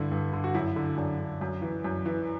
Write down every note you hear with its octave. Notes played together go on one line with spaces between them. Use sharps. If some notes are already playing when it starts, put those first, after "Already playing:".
Already playing: G2 D3 E4
G2
D3
F#4
F#2 E4
D3
F#2 D4
D3
F#2
E3
F#2
E3